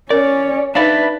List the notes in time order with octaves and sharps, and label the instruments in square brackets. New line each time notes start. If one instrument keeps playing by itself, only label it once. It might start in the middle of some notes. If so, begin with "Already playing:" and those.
[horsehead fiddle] C#4 C#5 [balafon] A#4 [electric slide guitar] D5
[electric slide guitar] D4 D5 E5 [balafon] D#4 F5 [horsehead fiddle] B4